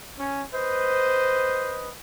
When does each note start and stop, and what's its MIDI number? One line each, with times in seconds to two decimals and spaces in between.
0.19 0.42 61
0.54 1.90 71
0.54 1.94 72
0.54 1.90 75